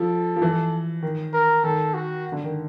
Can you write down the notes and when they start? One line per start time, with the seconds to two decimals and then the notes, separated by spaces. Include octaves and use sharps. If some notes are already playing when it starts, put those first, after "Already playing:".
Already playing: F3 A4
0.36 F3
0.42 E3
1.03 D#3
1.34 A#4
1.64 D#3 A4
1.94 F#4
2.32 D3
2.44 D#3